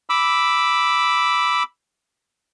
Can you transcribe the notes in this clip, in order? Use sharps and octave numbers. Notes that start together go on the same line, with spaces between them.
B5 D6 E6